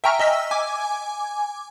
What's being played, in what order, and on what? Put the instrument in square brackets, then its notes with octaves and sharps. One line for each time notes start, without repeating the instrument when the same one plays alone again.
[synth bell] E5 G5 G#5 A#5 C#6 F6
D#5 E6 B6
G#5 D6 G#6